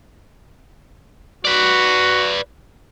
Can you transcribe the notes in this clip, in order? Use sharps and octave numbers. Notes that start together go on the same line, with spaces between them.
F#4 B4 D5